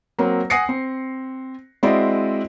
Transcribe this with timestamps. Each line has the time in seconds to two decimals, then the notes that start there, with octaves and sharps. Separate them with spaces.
0.19 F#3 A#3 C4
0.50 F#5 G#5 D#6 A#6 C7 C#7
0.69 C4
1.83 G#3 C4 E4 F#4 D5 D#5